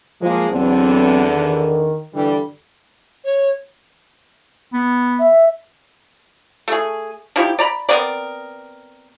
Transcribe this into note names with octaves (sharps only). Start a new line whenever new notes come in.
F3 G#3 A#3
E2 D3 F#3 B3 C4
D#3
G2 D3 E3 G3
C#5
B3
E5
A3 G#4
F3 D#4 E4 G4
D5 A#5 B5
B3 C4 A#4 D5